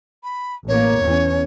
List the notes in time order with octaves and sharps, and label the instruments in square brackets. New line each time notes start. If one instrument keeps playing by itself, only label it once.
[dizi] B5
[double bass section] A1 A#3 [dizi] C#5
[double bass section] E2 C#4